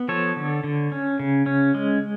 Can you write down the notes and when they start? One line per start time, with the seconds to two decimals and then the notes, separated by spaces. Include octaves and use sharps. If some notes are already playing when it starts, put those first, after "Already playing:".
Already playing: B3
0.08 F3 A4 C#5
0.36 D3
0.64 D3
0.92 C#4
1.20 C#3
1.46 C#4
1.74 G#3